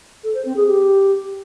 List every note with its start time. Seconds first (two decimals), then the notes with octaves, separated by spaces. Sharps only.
0.23 A4
0.34 C5
0.45 C4
0.56 G#4
0.66 G4